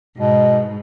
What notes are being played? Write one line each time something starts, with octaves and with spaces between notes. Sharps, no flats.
G#2 B2